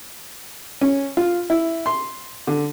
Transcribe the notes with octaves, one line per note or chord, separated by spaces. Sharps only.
C#4
F4
E4
C6
D3